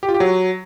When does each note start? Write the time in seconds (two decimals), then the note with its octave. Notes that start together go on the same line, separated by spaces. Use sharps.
0.03 G4
0.09 F4
0.14 G4
0.20 F#3